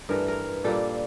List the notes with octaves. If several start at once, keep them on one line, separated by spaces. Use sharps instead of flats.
G2 E3 A3 A#4
A#4
A#2 G3 A#3 A4